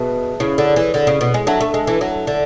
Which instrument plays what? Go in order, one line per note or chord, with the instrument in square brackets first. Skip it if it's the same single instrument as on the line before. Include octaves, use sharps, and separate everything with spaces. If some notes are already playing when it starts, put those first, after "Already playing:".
Already playing: [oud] B2 [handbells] G#4 B4 E5 A5
[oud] C#3 [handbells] E4 G#4 C#5
[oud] D3
E3
D3
C#3
B2
G#3
[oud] F#3 [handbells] D4 A4 E5 A5
[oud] A3
G#3
E3
F#3
D3